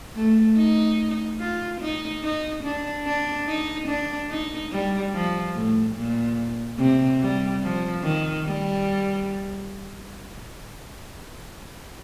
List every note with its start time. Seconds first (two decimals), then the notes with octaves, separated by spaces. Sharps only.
0.15 A3
0.57 D#4
1.40 F4
1.81 D#4
2.23 D#4
2.64 D4
3.06 D4
3.47 D#4
3.88 D4
4.30 D#4
4.72 G3
5.14 F3
5.55 A2
5.95 A#2
6.79 C3
7.20 G3
7.62 F3
8.03 D#3
8.45 G3